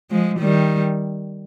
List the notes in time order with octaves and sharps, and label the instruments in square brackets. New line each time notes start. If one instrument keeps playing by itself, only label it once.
[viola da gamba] F3 G#3
D#3 G3